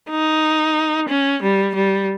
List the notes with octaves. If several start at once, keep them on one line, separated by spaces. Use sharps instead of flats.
D#4
C#4
G3
G3